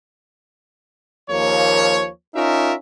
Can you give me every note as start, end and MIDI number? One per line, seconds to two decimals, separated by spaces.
1.31 2.09 39
1.31 2.09 53
1.31 2.09 58
1.31 2.09 73
2.36 2.75 61
2.36 2.75 63
2.36 2.75 65
2.36 2.75 70
2.36 2.75 76